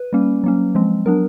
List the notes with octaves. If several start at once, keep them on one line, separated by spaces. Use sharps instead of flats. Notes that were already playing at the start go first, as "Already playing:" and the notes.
Already playing: B4
G3 A#3 C#4
F#3 A#3 C#4
F3 G#3 C4
F#3 B3 D4 A#4